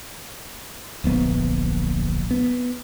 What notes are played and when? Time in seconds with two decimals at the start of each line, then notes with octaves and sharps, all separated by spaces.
1.04 D1 A#1 B3
2.31 B3